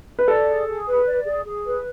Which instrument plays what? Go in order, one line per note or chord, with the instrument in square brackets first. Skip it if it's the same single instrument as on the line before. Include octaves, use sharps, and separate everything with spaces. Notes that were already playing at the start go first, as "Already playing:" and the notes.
[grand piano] B4
[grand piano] A4 [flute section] D5
[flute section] G#4
G#4
B4
D5
G#4
G#4
B4